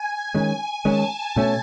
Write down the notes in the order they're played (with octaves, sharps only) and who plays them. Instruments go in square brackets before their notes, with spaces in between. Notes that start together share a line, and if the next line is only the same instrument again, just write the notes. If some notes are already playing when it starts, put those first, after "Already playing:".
Already playing: [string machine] G#5
[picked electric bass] D#3 G#3 C#4
[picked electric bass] D#3 G#3 C#4 [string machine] A5
[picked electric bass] B2 A3 C#4